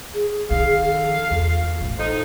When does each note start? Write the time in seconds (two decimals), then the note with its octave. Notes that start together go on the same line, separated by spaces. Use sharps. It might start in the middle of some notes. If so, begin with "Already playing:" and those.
0.14 G#4
0.51 D#3 F3 F5
0.91 A4
1.31 E2 F4
1.80 A1
1.98 A2 F3 D#4 A4